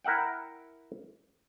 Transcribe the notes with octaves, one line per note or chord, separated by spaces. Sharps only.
E4 A#4 E5 F#5 G5